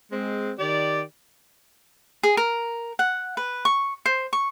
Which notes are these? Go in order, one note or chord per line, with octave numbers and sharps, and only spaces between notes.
G#3 C4
D#3 G4 D5
G#4
A#4
F#5
B4
C#6
C5
C#6